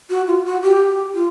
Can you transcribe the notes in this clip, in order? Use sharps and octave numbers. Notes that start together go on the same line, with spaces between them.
F#4
F4
F#4
G4
F4